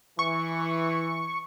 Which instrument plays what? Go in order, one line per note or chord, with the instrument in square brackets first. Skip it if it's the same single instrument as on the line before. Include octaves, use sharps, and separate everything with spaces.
[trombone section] E3 [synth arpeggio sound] C#6